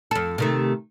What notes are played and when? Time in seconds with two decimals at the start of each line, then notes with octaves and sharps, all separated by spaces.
0.11 F2 A4
0.38 C3 D#3 A3